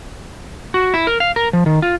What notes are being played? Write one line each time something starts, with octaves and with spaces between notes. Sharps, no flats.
F#4
E4
A#4
F5
A#4
F3
D#3
F4